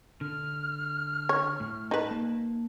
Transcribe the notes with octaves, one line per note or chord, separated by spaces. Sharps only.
D3 F6
C#5
A2
D#4 B4 C5 A5
A#3 A5